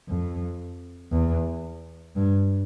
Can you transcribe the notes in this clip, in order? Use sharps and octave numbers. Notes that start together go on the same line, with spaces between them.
F2
E2
G2